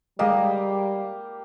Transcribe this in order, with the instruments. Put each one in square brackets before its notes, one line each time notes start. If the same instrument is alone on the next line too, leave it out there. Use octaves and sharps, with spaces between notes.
[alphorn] G3 [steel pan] G#3 D#5 [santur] A#3 G4